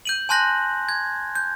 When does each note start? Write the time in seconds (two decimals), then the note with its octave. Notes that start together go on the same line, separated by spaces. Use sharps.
0.05 G6 D#7 F#7
0.29 G#5 A5 C6 F#6 G6 A#6
0.89 G#6
1.35 G6